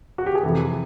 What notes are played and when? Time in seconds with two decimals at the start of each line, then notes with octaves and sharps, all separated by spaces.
0.18 F#4
0.26 G4
0.35 G#4
0.43 F2 C3 E3 A4